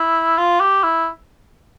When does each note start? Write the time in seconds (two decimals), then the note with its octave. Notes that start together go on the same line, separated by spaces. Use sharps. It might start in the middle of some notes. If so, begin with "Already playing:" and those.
Already playing: E4
0.38 F4
0.60 G4
0.83 E4